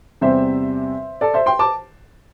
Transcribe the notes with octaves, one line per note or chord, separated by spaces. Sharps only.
E2 C3 G3 C4 C5 E5
A4 D5
C5 E5
G5 C6
A5 D6